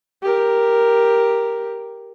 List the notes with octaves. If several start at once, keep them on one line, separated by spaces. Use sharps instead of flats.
G4 A#4